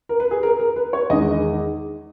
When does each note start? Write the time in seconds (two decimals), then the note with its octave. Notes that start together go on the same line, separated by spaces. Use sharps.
0.09 A#4
0.20 B4
0.31 G#4
0.43 A#4
0.59 A#4
0.76 B4
0.93 C#5
1.10 E2 D#3 G#3 D#5